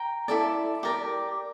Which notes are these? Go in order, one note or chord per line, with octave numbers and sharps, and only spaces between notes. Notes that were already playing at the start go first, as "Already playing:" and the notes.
Already playing: G5 A#5
E4 A4 D5
G4 A#4 D5